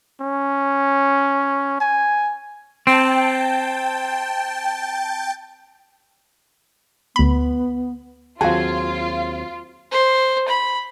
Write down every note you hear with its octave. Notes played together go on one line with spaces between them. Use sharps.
C#4
G#5
C4 G5 A5
D2 B3 B5
D#2 F#3 C4 F4 F#4 G#4 F5 A5
C5
B5